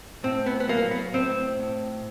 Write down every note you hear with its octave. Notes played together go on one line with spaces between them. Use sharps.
A2 C4
B3
B3
F#3 A#3
B3
A2 C4
A2